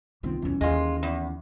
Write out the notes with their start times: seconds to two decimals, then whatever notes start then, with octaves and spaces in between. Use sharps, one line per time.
0.23 C2 D#3 A#3 C4 F4
0.42 B1 E2 E3 C#4
0.61 D#2 G#3 F4
1.03 E2